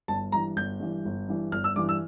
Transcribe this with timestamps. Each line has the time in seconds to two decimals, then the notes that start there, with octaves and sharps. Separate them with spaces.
0.08 G1 A5
0.32 G2 E3 A#5
0.57 G1 G6
0.80 G2 E3
1.05 G1
1.29 G2 E3
1.52 G1 F6
1.64 E6
1.76 G2 E3 D6
1.89 E6